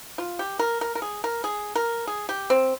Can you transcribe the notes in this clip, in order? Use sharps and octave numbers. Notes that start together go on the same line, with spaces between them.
F4
G4
A#4
A#4
A#4
G#4
A#4
G#4
A#4
G#4
G4
C4